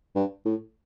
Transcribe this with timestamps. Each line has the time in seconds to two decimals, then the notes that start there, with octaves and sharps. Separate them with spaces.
0.15 G2
0.45 A2